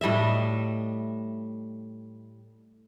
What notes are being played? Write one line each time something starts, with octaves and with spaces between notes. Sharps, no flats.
A2 G3 D#5 E5